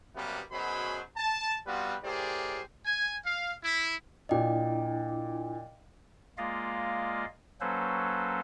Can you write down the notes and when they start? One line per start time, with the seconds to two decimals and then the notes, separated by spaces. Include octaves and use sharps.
0.16 F#2 C3 G3 A#3 B3
0.52 F#2 B2 F#3 G#4 C5 B5
1.17 A5
1.67 G3 B3 C4 F4 F#4 B4
2.04 A2 G4 G#4 A#4 C5 D5
2.86 G#5
3.26 F5
3.63 E4
4.29 A#2 D4 E4 D5 D#5 G5
6.38 G#3 A#3 F4 D5 D#5 F5
7.61 F#3 A#3 C#4 A4 B4 C5